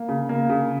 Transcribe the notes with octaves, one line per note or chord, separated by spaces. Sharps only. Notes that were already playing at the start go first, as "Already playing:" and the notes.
Already playing: A#3
C#3
A#3
C#3